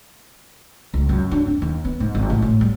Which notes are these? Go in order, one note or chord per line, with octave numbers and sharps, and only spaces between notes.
C#2
F#2
D4
C4
D#2
B3
G#2
G#1
A1
A2
G3